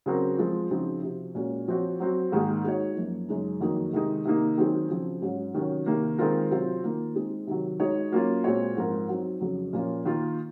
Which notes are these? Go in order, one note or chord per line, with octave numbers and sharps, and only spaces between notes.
C#3 F#3 C4 F#4 A#4
F3 G#3 C4 F4
C#3 F3 C4 D#4 F#4
C3 F3 C4 F#4
A#2 G#3 C#4 F#4
F3 C4 F#4 C#5
F#3 C4 F#4
G#2 D#3 A#3 D#4 G#4
G#3 D#4 F#4 C#5
F#2 F3 A#3
F#2 C#3 G#3 D#4
F2 D#3 F#3 A#3 D#4
C3 D#3 G#3 D#4
C3 D#3 A#3 D#4
D#3 F#3 C4 D#4 G#4
C#3 F3 C4 F#4
G#2 F#3 C#4 G#4
C3 D#3 F#3 C#4 F#4
C3 D#3 A#3
D#3 G#3 C4 F4 A#4
C3 F#3 C4 F4
D#3 A#3 F4
G#3 C4 D#4 G#4
C3 D#3 F#3
G#3 D#4 F#4 C#5
F#3 A#3 C#4 F4
A#2 G#3 C4 F#4 C#5
G#2 F3 C4 F4 A#4
F#3 C4 D#4
F2 C#3 F#3
A#2 F3 A#3 C#4 F4
D#3 A#3 F4